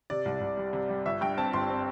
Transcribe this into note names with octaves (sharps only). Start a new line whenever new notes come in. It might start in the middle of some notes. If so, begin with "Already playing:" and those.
C3 D5
C2
C2
G3
C3
G3
G1 E5
G2 G5
C4 A5
G1 C6
C4